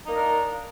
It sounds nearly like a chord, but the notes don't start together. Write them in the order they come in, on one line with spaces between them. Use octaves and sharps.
D#4 A#3 D#5 D4 A#4